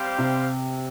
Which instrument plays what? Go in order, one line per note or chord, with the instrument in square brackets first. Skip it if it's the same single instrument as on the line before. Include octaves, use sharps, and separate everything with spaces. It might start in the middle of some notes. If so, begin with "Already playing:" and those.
Already playing: [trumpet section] G3 C4 G4 C5 F5
[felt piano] C3